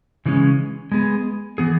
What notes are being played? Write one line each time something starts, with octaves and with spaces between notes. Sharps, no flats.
C#3 E3 G#3 C#4
G#3 B3 G#4
E3 B3 G#4